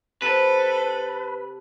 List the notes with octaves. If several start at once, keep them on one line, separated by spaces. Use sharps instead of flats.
C3 A4 B4